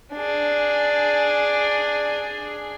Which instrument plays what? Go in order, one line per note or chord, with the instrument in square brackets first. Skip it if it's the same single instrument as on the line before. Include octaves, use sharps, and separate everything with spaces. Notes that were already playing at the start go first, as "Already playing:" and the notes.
[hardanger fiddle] D4 G#4